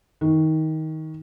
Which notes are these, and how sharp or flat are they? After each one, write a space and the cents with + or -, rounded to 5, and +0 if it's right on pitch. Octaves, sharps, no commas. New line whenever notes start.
D#3 +20